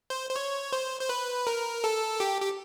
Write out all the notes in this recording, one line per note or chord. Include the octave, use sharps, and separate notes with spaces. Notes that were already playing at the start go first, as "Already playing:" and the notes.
C5
C5
C#5
C5
C5
B4
A#4
A4
G4
G4